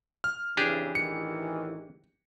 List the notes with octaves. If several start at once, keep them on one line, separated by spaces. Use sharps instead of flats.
F6
F2 C#3 E3 D4 G4 G#4
A1 D#3 E3 C#7